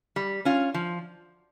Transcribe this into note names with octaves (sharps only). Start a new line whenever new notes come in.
G3
C#4 F4
F3